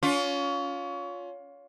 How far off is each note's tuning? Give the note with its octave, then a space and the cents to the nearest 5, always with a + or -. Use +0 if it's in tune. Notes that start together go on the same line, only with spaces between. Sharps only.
C#4 +30 F4 +20